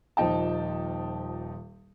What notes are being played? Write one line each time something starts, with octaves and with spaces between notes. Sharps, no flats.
D#1 F3 D#4 G5 A5